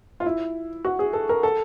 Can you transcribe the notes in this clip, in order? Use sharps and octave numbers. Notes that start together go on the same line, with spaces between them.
F4
E4
F#4
G#4
A4
A#4
A4